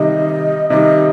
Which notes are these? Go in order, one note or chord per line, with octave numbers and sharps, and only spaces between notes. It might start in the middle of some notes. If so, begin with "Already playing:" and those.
Already playing: C3 D#3 G3 D#5
C3 D#3 G3 D#5